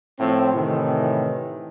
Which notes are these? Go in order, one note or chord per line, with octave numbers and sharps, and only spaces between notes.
A2 F3 C4
A2 C3 D#3 E3